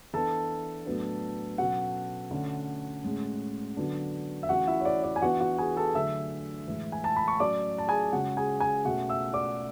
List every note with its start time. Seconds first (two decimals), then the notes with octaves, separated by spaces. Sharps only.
0.13 E3 B3 D4 A4 A5
0.86 A2 F#3 B3 D4
1.58 B2 F#3 C#4 F#4 F#5
2.31 D3 A3 C#4
3.04 A2 G#3 C#4
3.77 D3 F#3 B3 D4
4.43 E5
4.49 E3 A3 C#4 F#4 F#5
4.67 E4 E5
4.80 C#5
4.85 D5
5.04 D5
5.16 G#5
5.22 E3 B3 D4 F#4 F#5
5.40 F#4 F#5
5.58 G#4 G#5
5.77 A4 A5
5.95 D3 F#3 A3 D4 E5 E6
6.67 A2 E3 G#3
6.92 G#5
7.04 A5
7.16 B5
7.28 C#6
7.40 A2 F#3 C#4 D5 D6
7.78 A5
7.88 G#4 G#5
8.12 C#3 G#3 C#4 F#4 F#5
8.37 G#4 G#5
8.60 G#4 G#5
8.85 B2 A3 C#4 F#4 F#5
9.09 E5 E6
9.33 D5 D6